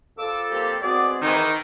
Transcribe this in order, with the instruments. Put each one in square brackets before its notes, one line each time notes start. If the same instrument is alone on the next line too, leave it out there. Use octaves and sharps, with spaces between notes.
[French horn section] F2 A4 [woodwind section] F4 D6 E6
[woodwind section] A#3 C4 G4
[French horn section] G#3 B3 C4 [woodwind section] F#4 G#4 [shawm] D5
[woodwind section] G#2 E3 [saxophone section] D#3 [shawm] D#4